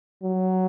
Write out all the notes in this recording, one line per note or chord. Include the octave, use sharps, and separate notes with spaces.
F#3